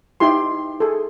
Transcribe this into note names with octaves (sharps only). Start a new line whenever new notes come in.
D#4 E4 G4 C6
G#4 A4